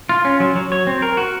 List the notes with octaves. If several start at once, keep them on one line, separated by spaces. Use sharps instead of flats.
F4
C#4
F#3
F#3
C#5
C4
A#4
F#4